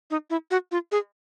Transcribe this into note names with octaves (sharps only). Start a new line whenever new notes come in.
D#4
E4
F#4
F4
G#4